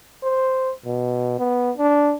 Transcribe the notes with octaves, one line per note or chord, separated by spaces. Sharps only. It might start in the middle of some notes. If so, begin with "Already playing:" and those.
C5
B2
B3
D4